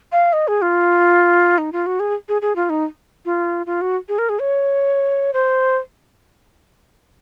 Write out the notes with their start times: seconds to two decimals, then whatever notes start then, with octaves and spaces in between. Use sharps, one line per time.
0.12 F5
0.33 D#5
0.48 G#4
0.62 F4
1.58 D#4
1.73 F4
1.86 F#4
2.00 G#4
2.29 G#4
2.42 G#4
2.56 F4
2.70 D#4
3.25 F4
3.66 F4
3.81 F#4
4.09 G#4
4.18 A#4
4.29 G#4
4.39 C#5
5.33 C5